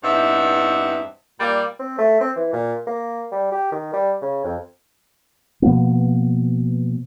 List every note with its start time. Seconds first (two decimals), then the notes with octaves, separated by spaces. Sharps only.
0.04 E2 G2 C4 D#4 E5 F#5
1.40 A#2 G3 A#3 D5
1.79 C4
1.98 A3
2.21 C4
2.36 E3
2.53 A#2
2.87 A#3
3.32 G3
3.52 G4
3.72 D#3
3.93 G3
4.21 C#3
4.44 F2
5.62 B2 F3 A#3 B3